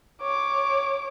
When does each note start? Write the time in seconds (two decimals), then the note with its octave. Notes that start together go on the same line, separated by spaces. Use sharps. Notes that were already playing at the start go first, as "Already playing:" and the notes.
0.22 C#5 D6